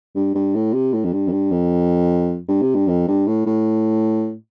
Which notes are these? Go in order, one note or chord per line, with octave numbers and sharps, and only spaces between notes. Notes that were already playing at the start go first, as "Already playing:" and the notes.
G2
G2
A2
C3
A2
F2
G2
F2
G2
F2
G2
C3
G2
F2
G2
A2
A2